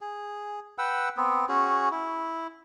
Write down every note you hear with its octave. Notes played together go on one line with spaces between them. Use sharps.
G#4
B4 F#5 G5 E6
B3 C4
C#4 F#4 G#4
E4